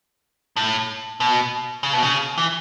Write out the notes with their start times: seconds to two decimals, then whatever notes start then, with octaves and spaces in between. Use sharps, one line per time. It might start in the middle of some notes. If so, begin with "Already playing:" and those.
0.57 A2
1.20 B2
1.83 C#3
1.93 B2
2.03 C#3
2.38 E3